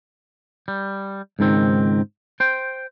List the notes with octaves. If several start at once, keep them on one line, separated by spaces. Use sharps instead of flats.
G3
C#2 G#2 D#3 C4
C5 G5